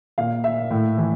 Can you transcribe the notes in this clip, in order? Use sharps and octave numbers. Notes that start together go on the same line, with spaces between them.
A#2 F5
E5
A2
E3